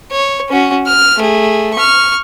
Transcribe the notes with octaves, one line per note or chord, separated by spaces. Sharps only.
C#5
C#4 F#4
F6
A3 G#4
C#6 F6